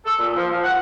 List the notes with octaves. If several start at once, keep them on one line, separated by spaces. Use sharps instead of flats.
A4
A#2
F3
F3
F#5